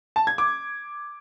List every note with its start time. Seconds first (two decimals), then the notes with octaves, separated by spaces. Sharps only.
0.16 A5
0.27 G#6
0.38 D6